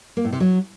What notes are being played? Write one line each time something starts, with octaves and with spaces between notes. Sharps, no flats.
A#3
A2
C3
F#3